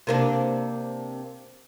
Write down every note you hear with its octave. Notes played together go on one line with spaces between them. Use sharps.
C3 A#3 D4